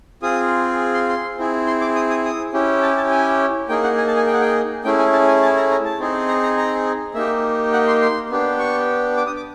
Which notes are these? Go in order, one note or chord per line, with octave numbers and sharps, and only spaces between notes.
C4 F4 G#4 D#6
C6
C6
C4 E4 G#4
C6
D6
D#6
D#6
D#6
C#4 E4 G4
A5
A5
G#5
A#3 D#4 G#4 G5
F#5
G#5
A5
G#5
G5
F#5
G5
A3 C#4 E4 G#4 G5
G#5
A5
G#5
A5
A#5
A#5
A5
C4 D#4 G#4
A#5
A#5
A#5
A#3 D#4 G4 E5
F#5
C6
C6
B3 D4 G4
C#6
D6
D#6
D6